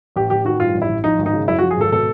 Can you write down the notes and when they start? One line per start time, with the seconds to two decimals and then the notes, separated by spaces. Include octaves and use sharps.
0.16 A1 G4
0.30 A1 G4
0.45 D#3 F#4
0.60 G2 F4
0.75 A1
0.82 E4
0.89 A1
1.04 F3 D#4
1.18 G#1
1.26 D#4
1.33 C#3
1.48 F#2 E4
1.59 F#4
1.62 F3
1.71 G#4
1.77 G#1 A4
1.91 B2 A4